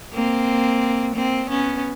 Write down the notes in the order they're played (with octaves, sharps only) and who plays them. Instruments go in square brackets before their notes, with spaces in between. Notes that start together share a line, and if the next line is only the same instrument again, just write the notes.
[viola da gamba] A#3 C4
A#3 C4
B3 C#4